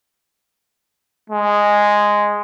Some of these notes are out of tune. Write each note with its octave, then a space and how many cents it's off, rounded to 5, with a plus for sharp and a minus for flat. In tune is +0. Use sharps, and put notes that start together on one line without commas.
G#3 -5